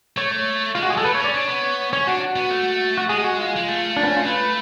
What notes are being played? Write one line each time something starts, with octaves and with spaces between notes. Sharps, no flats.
A3 C#5
C#5
G#3 F4
F#4
G#4
G#3 A4
A3 B4
C#5
C#4 D5
D4 C#5
B3
C#4 C#5
D4 F#4
F#4
B3
A3
F#4
G#3 G#4
F#4
F4
G#3
A3
D4
B3
C#4
F4
G#3
A3 B4